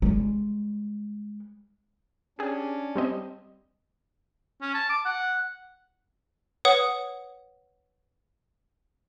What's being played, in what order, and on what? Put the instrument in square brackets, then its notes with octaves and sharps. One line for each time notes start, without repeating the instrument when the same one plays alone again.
[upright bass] G3 G#3
[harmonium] C#4 D4 [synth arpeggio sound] G4 G#4
[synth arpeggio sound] G3 C4 D#5
[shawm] C#4
A5
D6
F#5
[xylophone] B4 C#5 F#5 D#6